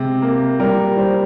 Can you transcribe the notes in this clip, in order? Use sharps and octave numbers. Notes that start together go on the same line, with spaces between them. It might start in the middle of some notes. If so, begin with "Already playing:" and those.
Already playing: C3 G#3
A#3
G3 A#4
G3 C5